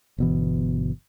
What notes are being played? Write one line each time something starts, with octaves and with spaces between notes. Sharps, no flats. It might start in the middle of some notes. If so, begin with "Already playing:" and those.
G1 B2 E3